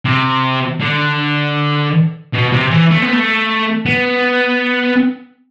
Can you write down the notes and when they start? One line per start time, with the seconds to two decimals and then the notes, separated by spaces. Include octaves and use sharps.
0.05 C3
0.80 D3
2.34 B2
2.52 C3
2.71 E3
2.91 A3
3.02 B3
3.13 A3
3.86 B3